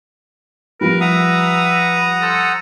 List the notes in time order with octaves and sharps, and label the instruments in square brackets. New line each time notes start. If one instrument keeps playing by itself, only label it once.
[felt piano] F3 G3 [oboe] A#4 [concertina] B4
[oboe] E5 [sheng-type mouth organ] F#5 A#5 D#6
[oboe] A4 [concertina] C5